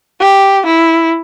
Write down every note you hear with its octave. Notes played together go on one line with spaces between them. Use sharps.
G4
E4